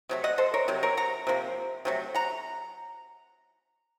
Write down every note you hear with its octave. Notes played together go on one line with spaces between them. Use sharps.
C3 F#3 A3
D#5 F#5
A4 C5
A#4 C#5
C3 F#3
A#4 C#5
F#5 A#5
C3 F3 A#3
C3 F#3 A3
F#5 A#5